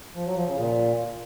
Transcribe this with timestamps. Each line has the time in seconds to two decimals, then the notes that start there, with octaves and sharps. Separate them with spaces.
0.15 F3
0.26 F#3
0.36 F3
0.47 C#3
0.58 A#2